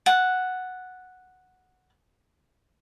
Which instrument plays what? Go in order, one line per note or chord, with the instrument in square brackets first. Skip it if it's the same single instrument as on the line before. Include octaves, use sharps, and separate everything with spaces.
[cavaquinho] F#5 A5